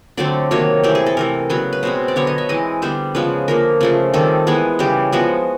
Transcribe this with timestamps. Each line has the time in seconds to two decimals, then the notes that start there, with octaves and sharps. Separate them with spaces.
0.17 D3 F#3 A3 C4 D5
0.51 C3 D#3 F#3 A#3 C#5
0.84 E3 A3 C4 G4
0.95 G#4
1.06 A4
1.17 C3 E3 A3 A#4
1.50 C#3 F#3 B3 B4
1.73 B4
1.83 B2 G#3 C4 C5
2.08 D5
2.16 D3 F#3 B3 C#5
2.27 D#5
2.38 E5
2.49 E3 G#3 C4 D#5
2.82 D3 G3 B3 C5
3.15 C#3 F3 G#3 B3 B4
3.48 D3 F3 A#3 A#4
3.81 C#3 F3 A3
4.14 D#3 G3 C4 A4
4.47 E3 G#3 B3 G#4
4.79 C#3 E3 G3 G4
5.12 F3 G#3 B3 F#4